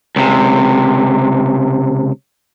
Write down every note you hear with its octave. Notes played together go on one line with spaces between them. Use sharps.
C#2 C3